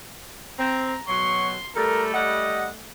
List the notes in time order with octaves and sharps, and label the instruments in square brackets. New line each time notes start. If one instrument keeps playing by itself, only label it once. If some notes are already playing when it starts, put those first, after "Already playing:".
[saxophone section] C4 [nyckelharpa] A#5
[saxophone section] B2 F#3 [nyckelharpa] C6 [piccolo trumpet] C#6
[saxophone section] G3 A4 [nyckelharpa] A3 [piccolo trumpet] A#4
[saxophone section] G3 F#5 [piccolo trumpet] D#5